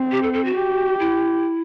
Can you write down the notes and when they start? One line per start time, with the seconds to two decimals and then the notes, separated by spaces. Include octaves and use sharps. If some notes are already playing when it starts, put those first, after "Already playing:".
Already playing: C4
0.12 G4
0.23 A4
0.33 A4
0.45 F#4
0.55 G4
1.00 E4